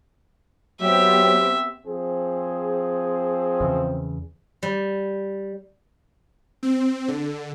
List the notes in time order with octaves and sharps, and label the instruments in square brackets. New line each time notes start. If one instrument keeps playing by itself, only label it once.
[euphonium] F#3 [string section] B3 C4 G4 [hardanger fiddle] E5
[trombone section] F3 C4 G#4
[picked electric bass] E2 C#3
[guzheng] G3
[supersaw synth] C4
D3